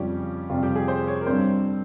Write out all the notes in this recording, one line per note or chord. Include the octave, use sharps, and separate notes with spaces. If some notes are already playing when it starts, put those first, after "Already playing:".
Already playing: F2 C#3 G3 C#4 F4 G4
F2 C3 G3 F4
G4
G#4
C5
C#5
A#4
G2 G3 C4 C5